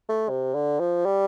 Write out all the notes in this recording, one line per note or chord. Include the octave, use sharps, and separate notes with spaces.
A3
C3
D3
F3
G3